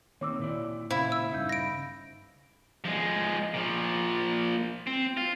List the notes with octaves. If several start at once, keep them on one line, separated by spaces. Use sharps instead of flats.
D#3 A#3 C4 C#5 D6 E6
A#2 E4 D5
A#2 C#3 E4 C5 F5
E6
G2 C#3 D#4 F5 G6
A#6 D7
F3 G#3
A#2 F3
C4
F4